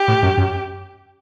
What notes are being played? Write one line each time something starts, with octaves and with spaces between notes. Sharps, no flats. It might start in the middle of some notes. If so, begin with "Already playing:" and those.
Already playing: G4
A2
F#2
F#2